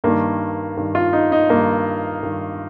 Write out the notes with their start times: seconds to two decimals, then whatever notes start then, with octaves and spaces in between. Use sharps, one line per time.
0.04 G2 D#3 A#3
0.77 G2 D#3
0.95 F4
1.13 D#4
1.32 D#4
1.49 G2 D#3 A#3
2.23 G2 D#3